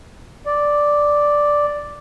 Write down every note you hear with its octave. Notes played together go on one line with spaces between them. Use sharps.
D5